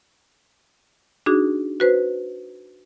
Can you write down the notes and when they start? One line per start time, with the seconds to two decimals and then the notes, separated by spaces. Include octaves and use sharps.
1.26 D4 D#4 F#4 G#4
1.80 F#4 B4 C5